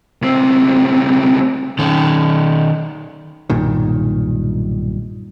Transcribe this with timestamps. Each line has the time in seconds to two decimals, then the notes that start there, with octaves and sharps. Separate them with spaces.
0.22 C#2 C4
1.79 D#3 C#4
3.50 B1 G2 A#2 D#3